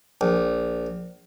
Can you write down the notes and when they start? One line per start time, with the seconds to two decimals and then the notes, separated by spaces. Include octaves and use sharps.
0.21 A#1